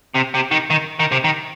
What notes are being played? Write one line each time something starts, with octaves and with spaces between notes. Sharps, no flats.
C3
C3
D#3
D#3
D#3
C3
D#3